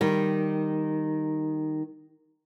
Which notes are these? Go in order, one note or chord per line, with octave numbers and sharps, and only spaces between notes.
D#3 G3